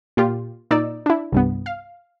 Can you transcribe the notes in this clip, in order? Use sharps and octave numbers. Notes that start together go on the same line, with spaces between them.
A#2 F4 G4
A#2 D#4 D5 E6
D4 E4
C2 G2 B3
F5